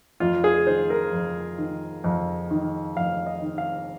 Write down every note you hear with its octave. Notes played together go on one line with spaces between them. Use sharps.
F2 F4
G#4
D#3 C5
A#4
F2
D#3
F2
D#3
F2 F5
D#5
D#3
F5